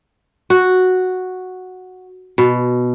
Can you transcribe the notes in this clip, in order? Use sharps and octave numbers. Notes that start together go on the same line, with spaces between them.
F#4
B2